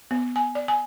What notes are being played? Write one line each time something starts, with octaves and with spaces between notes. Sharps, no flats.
B3
G#5
D5
G#5